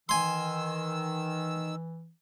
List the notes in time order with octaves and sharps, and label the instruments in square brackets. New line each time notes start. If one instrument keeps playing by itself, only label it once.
[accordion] D#3 E6 [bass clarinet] E3 [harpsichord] G#5 C6